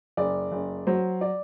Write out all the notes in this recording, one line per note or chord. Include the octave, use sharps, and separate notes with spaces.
F#1 D5
F#1
F#3 C5
D5